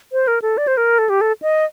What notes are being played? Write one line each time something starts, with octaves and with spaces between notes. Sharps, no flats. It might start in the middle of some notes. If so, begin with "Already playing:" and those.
C5
A#4
A4
D5
C5
A#4
A4
G4
A4
D#5